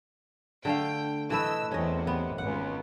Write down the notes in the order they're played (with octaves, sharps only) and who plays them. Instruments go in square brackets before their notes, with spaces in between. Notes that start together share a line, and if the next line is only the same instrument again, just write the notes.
[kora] D3 A3 F5 [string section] G5
[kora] E3 A3 B4 [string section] D#5 E6
[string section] E2 C3 [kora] C#4 D#5
[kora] B3
[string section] G#1 C#2 [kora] F#5